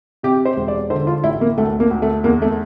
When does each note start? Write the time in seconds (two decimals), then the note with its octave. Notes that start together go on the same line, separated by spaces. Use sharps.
0.23 C3 G4
0.45 C5
0.56 E1
0.68 D5
0.90 D3 C5
1.07 F4
1.24 A1 E4
1.41 A#3
1.58 D2 A3
1.80 A#3
1.91 D2
2.02 A3
2.24 E2 A#3
2.42 A3